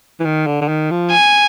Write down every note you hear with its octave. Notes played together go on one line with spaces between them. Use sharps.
E3
D#3
D3
D3
D#3
F3
G#5